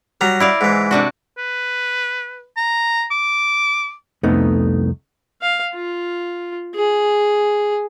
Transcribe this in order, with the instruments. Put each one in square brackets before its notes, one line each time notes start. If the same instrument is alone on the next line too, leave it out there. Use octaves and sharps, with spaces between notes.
[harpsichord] F#3 G3 [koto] A#5
[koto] E4 D5 F5
[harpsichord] G#2 E3
[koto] C3 D4 F#4
[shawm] B4
A#5
D6
[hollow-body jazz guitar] C2 F2 A3 B3 D#4
[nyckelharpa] F5
F4
G#4